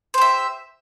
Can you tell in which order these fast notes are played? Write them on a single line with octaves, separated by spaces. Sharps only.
C5 G4 E5